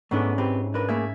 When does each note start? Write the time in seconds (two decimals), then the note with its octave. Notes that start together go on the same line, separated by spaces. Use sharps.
0.11 G#2 A3 B3 C#4 D4 E4
0.38 C4 G4 B4
0.74 D4 A#4 B4
0.88 A3 A#3 G#4 E5 G#6